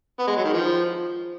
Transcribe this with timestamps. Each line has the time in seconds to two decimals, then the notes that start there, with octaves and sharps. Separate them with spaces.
0.19 B3
0.27 G#3
0.37 F#3
0.44 D#3
0.53 F3